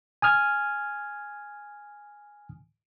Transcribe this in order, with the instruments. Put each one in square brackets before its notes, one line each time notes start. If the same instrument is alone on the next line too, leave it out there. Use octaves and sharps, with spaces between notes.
[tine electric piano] G#5 D#6 F6 G#6